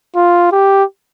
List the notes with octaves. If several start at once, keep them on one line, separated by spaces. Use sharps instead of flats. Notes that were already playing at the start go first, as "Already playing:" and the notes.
F4
G4